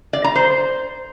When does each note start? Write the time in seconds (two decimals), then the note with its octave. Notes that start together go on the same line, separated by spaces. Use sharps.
0.13 D5
0.24 A#5
0.36 C5